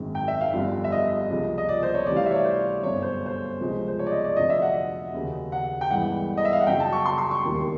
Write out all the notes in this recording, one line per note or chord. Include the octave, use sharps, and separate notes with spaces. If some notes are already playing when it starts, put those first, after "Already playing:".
Already playing: G#1 F#2 D#3 G#3
G5
E5
F5
G1 F2 D3 G3 F5
E5
D#5
C#2 C3 F3 G#3
D#5
D5
C5
C#5
D2 C3 E3 G3 D5
F5
E5
C#5
D5
C5
G1 F#2 D3 C#5
C5
C5
C#2 C3 F3 G#3
C5
C#5
D5
D#5
D5
F1 F2 D3 F#3 D#5
E5
F#5
D#2 C#3 F#3
F#5
G5
G1 G2 E3 G#3 F#5
D#5
E5
F5
F#5
F#2 C#3 F#3 G5
A5
C#6
C6
C6
C#6
E1 D#2 D#3 G3 A#3